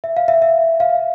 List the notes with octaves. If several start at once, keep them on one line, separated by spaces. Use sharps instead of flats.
E5
F5
E5
E5
F5